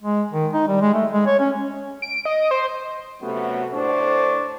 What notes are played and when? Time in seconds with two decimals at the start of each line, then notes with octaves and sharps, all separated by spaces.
0.02 G#3
0.32 D#3
0.53 D#4
0.68 G3
0.81 G#3
0.93 A3
1.12 G#3
1.26 C#5
1.39 C#4
2.02 D7
2.25 D#5
2.51 C5
3.21 C3 F#3 A3 B3 C#4 F#4
3.72 A2 D4 C5 C#6